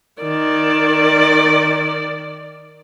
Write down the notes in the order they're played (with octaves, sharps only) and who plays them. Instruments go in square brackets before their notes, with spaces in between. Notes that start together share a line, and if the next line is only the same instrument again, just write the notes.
[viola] D#3 D5